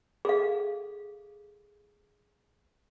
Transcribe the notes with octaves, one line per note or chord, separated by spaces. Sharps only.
G#4 A4 F5